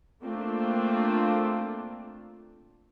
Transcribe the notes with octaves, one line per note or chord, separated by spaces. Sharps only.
A3 A#3 C4 D4 F4